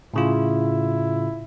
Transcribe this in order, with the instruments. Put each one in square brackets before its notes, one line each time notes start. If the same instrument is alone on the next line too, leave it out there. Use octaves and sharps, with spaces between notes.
[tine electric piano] A2 C#3 F4 [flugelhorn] E4